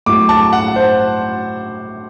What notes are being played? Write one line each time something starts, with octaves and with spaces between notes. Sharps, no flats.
A2 F#3 D6
A5
F#5
C5